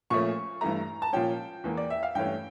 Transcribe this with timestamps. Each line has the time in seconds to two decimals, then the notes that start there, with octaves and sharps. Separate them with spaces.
0.10 A#2 F3 A3 C#4 C#6
0.61 G2 E3 A3 A#5
1.02 A5
1.13 A#2 F3 C#4 G5
1.64 E2 E3 A#3
1.77 D5
1.90 E5
2.03 F5
2.15 G2 E3 A3 C#4 G5